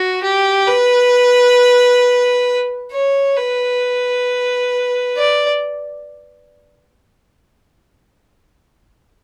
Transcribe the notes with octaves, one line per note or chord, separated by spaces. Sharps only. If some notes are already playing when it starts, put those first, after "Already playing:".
Already playing: F#4
G4
B4
C#5
B4
D5